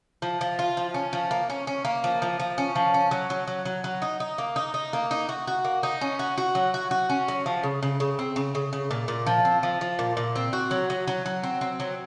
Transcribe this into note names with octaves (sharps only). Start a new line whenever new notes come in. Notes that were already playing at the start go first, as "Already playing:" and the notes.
F3
F3
F4
F3
C#4
F3
A#3
C#4
C#4
A#3
F3
F3
F3
C#4
F3
C#4
F#3
F#3
F#3
F#3
F#3
D#4
D#4
A#3
D#4
D#4
A#3
D#4
F#4
F#4
A#3
D#4
C#4
F#4
F#4
F#3
F#4
F#4
C#4
F#3
F3
C#3
C#3
C#3
C4
C#3
C#3
C#3
A#2
A#2
F3
C4
F3
F3
A#2
A#2
C4
F#4
F#3
F#3
F#3
F#3
C4
C4
F#3